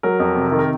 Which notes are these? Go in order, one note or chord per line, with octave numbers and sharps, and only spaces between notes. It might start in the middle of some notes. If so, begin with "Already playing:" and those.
F#3 A#4
F2
C3
D#3
A#4